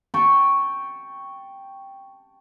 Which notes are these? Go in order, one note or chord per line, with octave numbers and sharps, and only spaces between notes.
G5 A5 C#6